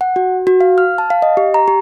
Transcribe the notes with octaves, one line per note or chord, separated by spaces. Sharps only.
F#5
F#4
F#4
F5
F6
A5
F5
D#5
G4
A#5
G4